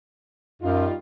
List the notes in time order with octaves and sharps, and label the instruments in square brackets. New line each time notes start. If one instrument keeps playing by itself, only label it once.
[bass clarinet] F#2 [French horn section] G3 D#4 F4